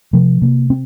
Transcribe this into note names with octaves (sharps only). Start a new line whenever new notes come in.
C3 F3
C3 A#3
C4